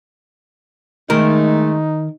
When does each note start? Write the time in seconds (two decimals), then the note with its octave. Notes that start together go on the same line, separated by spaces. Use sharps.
1.10 D#3 G#3 A3 D#4 A#4